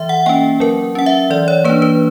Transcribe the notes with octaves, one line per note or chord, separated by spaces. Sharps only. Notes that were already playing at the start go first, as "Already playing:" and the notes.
Already playing: E3 E5
F#5
A#3 C#4 G5
F#3 A#4
C#4 F#5
E5
E3 D5
C#5
A#3 D4 B4
B4